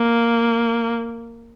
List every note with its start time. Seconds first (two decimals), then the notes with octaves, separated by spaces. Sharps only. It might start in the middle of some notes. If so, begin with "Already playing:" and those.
Already playing: A#3